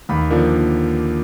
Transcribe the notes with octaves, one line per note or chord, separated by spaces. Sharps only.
D#2 B5
D3 F3 A#3